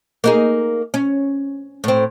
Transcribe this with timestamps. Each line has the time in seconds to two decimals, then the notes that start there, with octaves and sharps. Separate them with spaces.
0.24 A#3 D#4 G#4
0.94 C#4
1.84 A2 C4